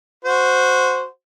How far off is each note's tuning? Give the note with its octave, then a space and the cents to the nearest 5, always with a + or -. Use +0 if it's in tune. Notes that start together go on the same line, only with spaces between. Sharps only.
F#4 -15 C5 -10